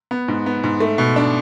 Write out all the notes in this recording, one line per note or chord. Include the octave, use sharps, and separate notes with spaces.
B3
G#2
B3
G#2
A3
B2
D4